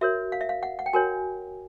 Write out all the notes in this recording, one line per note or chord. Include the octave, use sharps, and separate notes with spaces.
F#4 A#4 C#5 E5
F5
E5
F5
F#5
F#5
G5
F#4 A#4 C#5 G#5